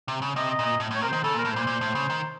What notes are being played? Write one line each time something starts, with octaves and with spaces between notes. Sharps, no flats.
C3
C#3
C3 D#5
D#5
A#2
D#5
A2
A2 C#5
C3 A#4
D#3 C5
C#3 A4
A#2
A#4
A2
A#2 C5
A#2
A2
C#3
D#3